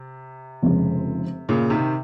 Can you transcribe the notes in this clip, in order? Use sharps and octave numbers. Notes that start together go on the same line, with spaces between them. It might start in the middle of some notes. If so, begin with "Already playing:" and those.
Already playing: C3
F1 F2 C#3 G#3
A#2 C#3
C3 D#3